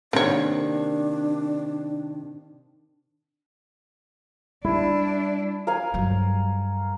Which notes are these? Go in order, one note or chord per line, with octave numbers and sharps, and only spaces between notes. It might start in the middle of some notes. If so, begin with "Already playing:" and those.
C3 D#3 A#3 C4 D4 C#5
G3 D4 E4
A#4 F5 G#5
G2 F#3